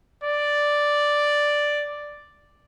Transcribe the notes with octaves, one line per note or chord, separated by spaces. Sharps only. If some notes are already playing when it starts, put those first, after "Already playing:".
D5